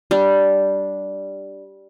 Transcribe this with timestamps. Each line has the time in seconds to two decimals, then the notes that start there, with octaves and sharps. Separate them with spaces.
0.11 G3 D4